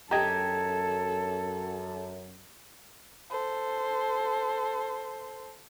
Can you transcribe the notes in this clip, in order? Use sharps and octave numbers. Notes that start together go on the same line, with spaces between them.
F#2 G4 A4 D#5 G5 A#5 G#6
A4 C5